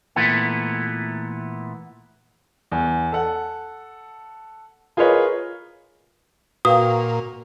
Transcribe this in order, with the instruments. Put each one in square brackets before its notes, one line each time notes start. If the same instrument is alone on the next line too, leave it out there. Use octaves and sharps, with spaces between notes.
[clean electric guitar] A#2 E3 A3 B3
[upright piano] E2
A4 F#5
F4 G#4 A#4 B4 C#5 D#5
[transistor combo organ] A#2 [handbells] F#4 [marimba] B4 F5 G5 [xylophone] D#6